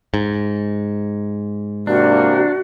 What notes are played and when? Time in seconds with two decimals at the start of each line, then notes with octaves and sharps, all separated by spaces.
0.14 G#2
1.87 C3 E3 A#3 D4 F#4